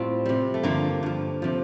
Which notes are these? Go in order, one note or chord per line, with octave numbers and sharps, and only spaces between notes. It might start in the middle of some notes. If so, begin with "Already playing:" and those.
Already playing: A2 G3 C4 F4
C3 G3
A3
G2 D3 F3 A#3
G2 F3
C3 F3